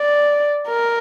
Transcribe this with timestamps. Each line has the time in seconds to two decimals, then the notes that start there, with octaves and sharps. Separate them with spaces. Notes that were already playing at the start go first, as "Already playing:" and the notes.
Already playing: D5
0.68 A#4